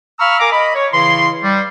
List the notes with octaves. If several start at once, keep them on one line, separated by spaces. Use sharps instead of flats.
F5 A#5 B5 C#6 E6 F6
A#4 F5 G#5 A#5 D6
D#5 B5
C#5
C#3 E3 E4 C6
G3